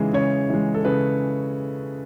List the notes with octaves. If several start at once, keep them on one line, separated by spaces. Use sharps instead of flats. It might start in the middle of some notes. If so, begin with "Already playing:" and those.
Already playing: C#3 E3 G#3
C#3 C#5
E3 G#3
A4
C#3 B4